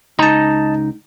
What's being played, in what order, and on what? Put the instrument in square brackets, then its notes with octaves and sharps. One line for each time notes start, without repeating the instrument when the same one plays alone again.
[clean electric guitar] C#2 D#4 A#5 [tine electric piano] D#5 A5